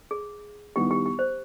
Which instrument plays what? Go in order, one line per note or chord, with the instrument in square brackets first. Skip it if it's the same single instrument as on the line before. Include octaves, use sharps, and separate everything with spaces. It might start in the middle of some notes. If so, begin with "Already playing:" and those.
[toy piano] G#4
[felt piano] D#3 G3 B3 E4 [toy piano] G4
[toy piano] G4
G4
C5